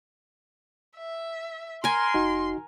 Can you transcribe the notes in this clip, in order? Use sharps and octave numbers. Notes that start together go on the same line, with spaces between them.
E5
A#4 G#5 C6
F1 D#4 F#4